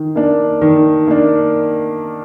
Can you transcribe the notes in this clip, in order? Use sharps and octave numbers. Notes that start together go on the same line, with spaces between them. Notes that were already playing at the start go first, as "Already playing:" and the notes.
Already playing: D#3
A#3 D4
D#3
A#3 D4